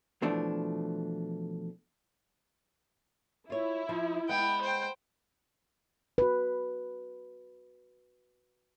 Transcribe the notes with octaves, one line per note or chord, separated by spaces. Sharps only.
B2 E3 F3 A3 D4
E4 F4 C#5
F3
G#3 B3 G5
C5 G5
F#4 B4